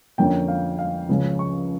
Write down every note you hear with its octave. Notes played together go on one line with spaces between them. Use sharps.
F2 D3 F3 A#3 C#4 G5
F5
F5
C#2 C#3 F3 C#4
C#6